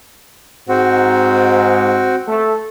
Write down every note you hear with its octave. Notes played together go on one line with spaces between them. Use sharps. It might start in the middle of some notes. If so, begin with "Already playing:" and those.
G#2 C4 F#4
A3 A4